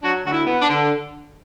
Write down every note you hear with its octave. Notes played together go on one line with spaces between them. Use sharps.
F#3 D4 F#4
D2 F#4
E4
B3
D4
D3